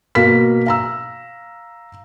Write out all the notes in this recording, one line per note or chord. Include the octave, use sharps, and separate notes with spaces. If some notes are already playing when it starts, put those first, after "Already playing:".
B2 A#3 A#4 B6
F5 A#5 E6